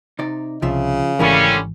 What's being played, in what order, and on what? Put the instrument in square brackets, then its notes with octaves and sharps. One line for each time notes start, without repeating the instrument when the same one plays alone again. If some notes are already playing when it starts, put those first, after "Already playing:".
[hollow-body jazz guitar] C3 D#4 D5
[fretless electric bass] C2 [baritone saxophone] C#3 [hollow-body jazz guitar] F3 F4 E5
[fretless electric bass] G#1 E3 [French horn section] D3 G3 C#4 [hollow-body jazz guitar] A3 E4 A#4